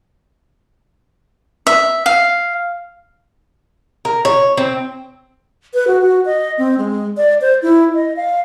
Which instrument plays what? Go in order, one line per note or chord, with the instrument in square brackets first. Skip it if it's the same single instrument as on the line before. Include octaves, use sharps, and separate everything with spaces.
[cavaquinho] E5
F5
[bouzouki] A#4
C#5
C4
[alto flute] B4
F#4
F#4
D#5
C4
G#3
D5
C5
E4
D#5
F5